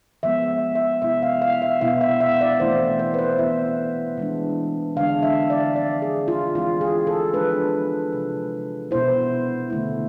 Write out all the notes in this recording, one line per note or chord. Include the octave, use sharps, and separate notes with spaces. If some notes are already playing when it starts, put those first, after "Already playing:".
F3 G#3 B3 E5
E5
C3 F3 G#3 B3 E4 E5
F5
F5
E5
B2 B3 E4 F5
E5
E5
D5
E3 A3 C4 E4 C5
C5
B4
C5
E3 B3 E4 E5
E3 G#3 D4
D3 G#3 D4 F5
E5
D5
D3 F3 G#3 C4 D5
G#4
F4
E3 G#3 C4 E4 F4
G#4
A4
F3 G#3 D4 B4
C3 F3 G#3
B2 B3 E4 C5
D3 A3 E4